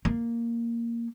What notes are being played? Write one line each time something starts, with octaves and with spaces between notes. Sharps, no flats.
A#3